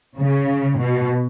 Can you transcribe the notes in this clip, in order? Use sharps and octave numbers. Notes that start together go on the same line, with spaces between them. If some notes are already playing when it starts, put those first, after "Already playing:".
C#3
B2